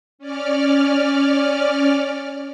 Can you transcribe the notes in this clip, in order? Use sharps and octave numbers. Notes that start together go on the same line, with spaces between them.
C#4 D5 F6